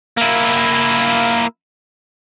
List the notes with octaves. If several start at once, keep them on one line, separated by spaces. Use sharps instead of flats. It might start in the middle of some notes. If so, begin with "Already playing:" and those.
A#3 E4